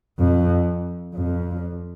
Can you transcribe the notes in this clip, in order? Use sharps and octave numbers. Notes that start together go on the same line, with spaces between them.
F2
F2